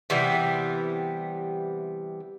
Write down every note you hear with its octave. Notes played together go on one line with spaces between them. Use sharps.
C3 E3 G3 B3